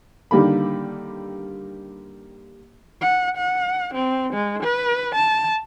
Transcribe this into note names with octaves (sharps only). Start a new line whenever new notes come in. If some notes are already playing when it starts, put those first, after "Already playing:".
D3 D#3 G3 A#3 B5
F#5
F#5
C4
G#3
B4
A5